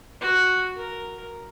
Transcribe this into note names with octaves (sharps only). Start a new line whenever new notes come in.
F#4
A#4